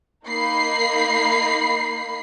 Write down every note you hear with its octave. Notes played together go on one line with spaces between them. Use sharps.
A#3 D#4 B5 C7